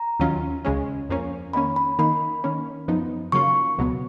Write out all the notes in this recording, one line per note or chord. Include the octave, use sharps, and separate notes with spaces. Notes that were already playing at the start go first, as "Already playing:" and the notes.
Already playing: A#5
D#2 D#3 F#3 C#4 F4
C#2 C#3 G#3 C#4
F2 F3 A#3 C#4
D#3 A#3 C#4 B5
B5
D#3 A#3 D#4 B5
D#3 A#3 C#4
F#2 F3 B3 D#4
C#3 F#3 A#3 F4 C#6
C#2 B2 F#3 B3